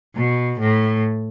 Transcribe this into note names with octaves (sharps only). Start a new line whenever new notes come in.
B2
A2